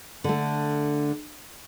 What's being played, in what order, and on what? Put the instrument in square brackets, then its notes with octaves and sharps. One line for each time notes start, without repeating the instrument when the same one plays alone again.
[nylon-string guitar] D3 A3